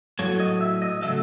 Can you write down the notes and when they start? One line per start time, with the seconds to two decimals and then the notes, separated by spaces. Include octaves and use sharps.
0.19 A2 F#3 A3 C#5
0.40 D#5
0.61 E5
0.82 D#5
1.02 C#3 F#3 A3 E5